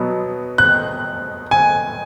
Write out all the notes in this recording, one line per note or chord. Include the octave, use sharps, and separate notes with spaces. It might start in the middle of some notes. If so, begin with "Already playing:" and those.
Already playing: B2 F#3 B3
F#6
G#5